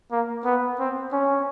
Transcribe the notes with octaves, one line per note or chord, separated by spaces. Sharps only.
A#3
B3
C4
C#4